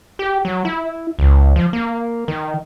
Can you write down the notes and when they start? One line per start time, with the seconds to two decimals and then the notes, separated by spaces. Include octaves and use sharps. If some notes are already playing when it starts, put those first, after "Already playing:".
0.19 G4
0.45 F#3
0.65 E4
1.19 C#2
1.56 F3
1.73 A#3
2.28 D#3